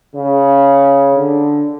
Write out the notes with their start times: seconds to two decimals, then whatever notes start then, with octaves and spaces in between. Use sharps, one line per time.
0.14 C#3
1.14 D3